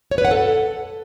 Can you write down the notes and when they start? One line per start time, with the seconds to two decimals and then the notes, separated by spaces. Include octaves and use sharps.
0.11 C#5
0.18 B4
0.25 F#5
0.31 A4